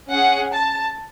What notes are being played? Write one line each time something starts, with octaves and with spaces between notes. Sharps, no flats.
C#4 G#4 F#5
A5